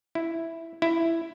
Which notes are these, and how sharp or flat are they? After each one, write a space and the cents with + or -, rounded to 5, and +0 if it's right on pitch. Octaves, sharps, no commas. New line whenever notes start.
E4 +0
E4 +5